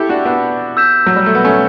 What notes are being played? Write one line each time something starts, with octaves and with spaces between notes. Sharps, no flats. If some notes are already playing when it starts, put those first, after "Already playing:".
Already playing: E4 G4 A4
D4 F#4
B3 D4
E6 G6 B6 E7
F#3
G3
A3
B3
A3 C#4